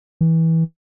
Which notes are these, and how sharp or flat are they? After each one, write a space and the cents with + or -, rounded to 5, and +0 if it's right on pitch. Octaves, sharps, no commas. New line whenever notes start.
E3 -20